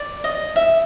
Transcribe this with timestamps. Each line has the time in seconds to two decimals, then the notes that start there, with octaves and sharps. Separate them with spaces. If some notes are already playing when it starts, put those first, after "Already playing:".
Already playing: D5
0.24 D#5
0.56 E5